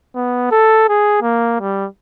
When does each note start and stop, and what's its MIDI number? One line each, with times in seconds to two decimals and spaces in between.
0.15 0.49 59
0.51 0.88 69
0.89 1.19 68
1.22 1.60 58
1.60 1.87 55